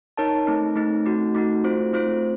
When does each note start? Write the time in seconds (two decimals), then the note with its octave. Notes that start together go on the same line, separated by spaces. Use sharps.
0.17 D#4 A#4 C#5 A5
0.47 A3 C4 D#4
0.76 A3 C4 D#4
1.06 A3 D#4 F#4
1.35 A3 D#4 F#4
1.64 A3 C4 F4 C5
1.93 A3 C4 F4 C5